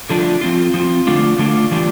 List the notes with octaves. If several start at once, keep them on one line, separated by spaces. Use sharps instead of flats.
D3 F3 A3 D4 F4
F3 C4 F4
F3 C4 F4
D3 A3 D4 F4
D3 A3 D4 F4
E3 G3 D4 F4